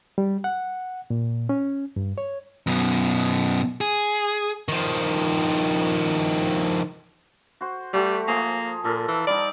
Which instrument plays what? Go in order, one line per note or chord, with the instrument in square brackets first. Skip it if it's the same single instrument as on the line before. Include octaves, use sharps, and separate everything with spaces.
[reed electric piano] G3
F#5
A#2
C#4
G2
C#5
[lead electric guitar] F#2 B2
G#4
[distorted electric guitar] D#3 F3
[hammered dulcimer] F#4 C5
[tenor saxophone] G3 [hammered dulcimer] A3 F#4 G4
[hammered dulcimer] F3 G#4 [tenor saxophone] A#3
[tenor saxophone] A#2 [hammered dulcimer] A4 A#4
[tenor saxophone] E3
[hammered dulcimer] G3 D#4 [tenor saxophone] D5